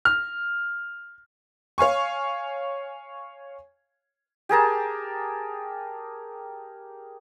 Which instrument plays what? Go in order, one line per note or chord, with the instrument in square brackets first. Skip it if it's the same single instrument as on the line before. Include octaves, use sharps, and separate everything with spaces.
[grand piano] F6
[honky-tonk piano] C#5 F5 G#5 C#6
[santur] G4 G#4 A#4 A5